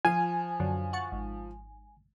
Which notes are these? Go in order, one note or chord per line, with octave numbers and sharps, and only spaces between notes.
F3 F4 G#5 D#7
F#2 D3 F#3
F#5 C#6 A6
G#1